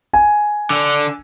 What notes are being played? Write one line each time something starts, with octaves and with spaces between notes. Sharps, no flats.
G#5
D3